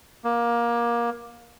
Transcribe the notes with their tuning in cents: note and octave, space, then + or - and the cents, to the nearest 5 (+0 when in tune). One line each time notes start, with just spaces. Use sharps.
A#3 +20